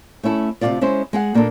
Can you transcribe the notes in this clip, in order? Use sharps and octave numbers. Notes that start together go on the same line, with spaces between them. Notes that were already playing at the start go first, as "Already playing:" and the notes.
A3 C#4 E4 A4
D2 C3 D#3 F#3 F4 D5
G#3 C#4 E4 C5
G#3 G#4 F#5
A#2 A#3 D4 A4